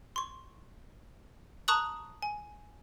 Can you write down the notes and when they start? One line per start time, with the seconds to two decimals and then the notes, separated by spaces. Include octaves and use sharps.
0.16 C6 C#6
1.68 A5 A#5 C#6 D#6 F#6 F#7
2.22 G#5